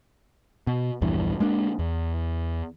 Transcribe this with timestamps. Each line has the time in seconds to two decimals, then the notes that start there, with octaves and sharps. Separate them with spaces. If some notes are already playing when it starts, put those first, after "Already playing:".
0.67 B2
1.02 A#1 E2 G2 E3
1.40 G#3 A#3 D4
1.79 E2